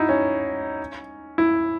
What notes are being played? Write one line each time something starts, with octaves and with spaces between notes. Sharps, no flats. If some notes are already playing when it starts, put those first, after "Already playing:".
Already playing: D#4 E4 F#4
C#4
E4